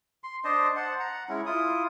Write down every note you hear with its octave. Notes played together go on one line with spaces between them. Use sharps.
C6
D4 C5 D#5 A5
C5 F#5 A5
F#5 A#5
G#3 C#4 E4
E4 F4 D#6